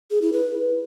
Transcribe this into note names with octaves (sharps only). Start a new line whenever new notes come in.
G#4
E4
B4